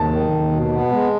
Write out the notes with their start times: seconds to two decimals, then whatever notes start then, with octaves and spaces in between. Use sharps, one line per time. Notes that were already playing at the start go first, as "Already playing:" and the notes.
Already playing: D#2 A5
0.10 D#3
0.31 D#2
0.51 B2
0.71 B3
0.91 G#3